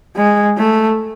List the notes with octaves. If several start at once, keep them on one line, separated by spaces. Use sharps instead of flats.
G#3
A3